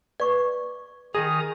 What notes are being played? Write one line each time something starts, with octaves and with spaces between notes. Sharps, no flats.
B4 D5 C#6 D6
D#3 F4 G#4 A#5 D#6